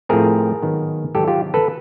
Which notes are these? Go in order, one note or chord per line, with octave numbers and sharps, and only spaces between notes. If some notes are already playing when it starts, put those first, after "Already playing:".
A2 F3 A3 C4 G#4 A#4
G#2 D#3 F#3 B3
G#2 D#3 F#3 B3 G4 A4
F4 G4
A4 B4